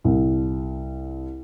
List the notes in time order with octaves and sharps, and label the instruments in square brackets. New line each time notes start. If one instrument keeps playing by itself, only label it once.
[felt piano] C2